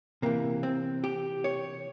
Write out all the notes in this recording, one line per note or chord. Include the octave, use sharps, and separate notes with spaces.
C3 E3 A#3
C4
G4
C#5